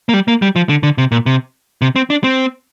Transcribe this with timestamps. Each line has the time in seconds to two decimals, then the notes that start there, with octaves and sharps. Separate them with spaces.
0.09 A#3
0.14 G3
0.28 A#3
0.42 G3
0.56 F3
0.69 D3
0.83 D3
0.98 C3
1.12 A#2
1.26 C3
1.82 C3
1.96 C4
2.10 D4
2.24 C4